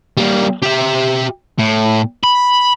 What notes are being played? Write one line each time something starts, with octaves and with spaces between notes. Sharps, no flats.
G3 A#3
G4 E5
A2
B5